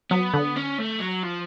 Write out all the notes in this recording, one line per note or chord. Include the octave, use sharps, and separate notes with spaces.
F#3 B3
D3
C#4
A3
F#3
F3